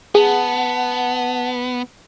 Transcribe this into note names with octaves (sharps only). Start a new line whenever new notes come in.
B3 G#4 F#5 A5